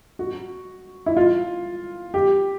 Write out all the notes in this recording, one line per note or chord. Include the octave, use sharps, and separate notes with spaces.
F#4
E4
F4
G4